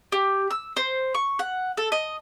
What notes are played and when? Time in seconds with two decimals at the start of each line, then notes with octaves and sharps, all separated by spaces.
0.12 G4
0.51 E6
0.77 C5
1.15 C#6
1.39 F#5
1.77 A4
1.92 D#5